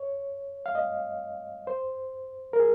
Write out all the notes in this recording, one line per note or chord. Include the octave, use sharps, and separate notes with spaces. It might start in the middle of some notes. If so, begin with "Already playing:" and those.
Already playing: C#5
F5
D#5
C5
A#4
G#4